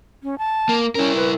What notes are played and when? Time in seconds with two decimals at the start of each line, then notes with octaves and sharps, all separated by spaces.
0.23 C#4
0.38 A5
0.69 A#3
0.95 C#4 E4 A#4
1.16 B4